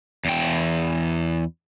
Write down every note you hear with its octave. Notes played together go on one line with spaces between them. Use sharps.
E2 G5